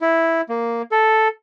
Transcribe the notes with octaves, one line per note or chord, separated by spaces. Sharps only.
E4
A#3
A4